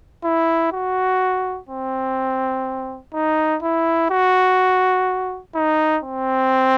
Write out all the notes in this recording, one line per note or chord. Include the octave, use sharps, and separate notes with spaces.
E4
F#4
C4
D#4
E4
F#4
D#4
C4